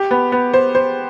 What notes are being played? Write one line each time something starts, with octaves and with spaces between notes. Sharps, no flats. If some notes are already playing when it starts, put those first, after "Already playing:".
Already playing: G4
B3
B3
C5
C5